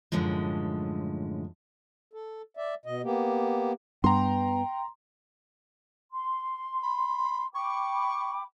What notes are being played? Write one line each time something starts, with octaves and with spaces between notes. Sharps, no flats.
F#2 A2 D3 F3 G#3
A4
D5 E5
B2 D#5
A#3 B3 G4
G2 B3 G5 A#5 C6
C6
B5
G5 B5 C#6 D6